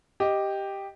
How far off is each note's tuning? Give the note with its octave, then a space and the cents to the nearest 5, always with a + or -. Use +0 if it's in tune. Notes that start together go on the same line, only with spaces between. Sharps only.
G4 +0 D#5 +0